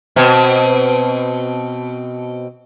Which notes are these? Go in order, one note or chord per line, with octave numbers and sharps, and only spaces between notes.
B2 C4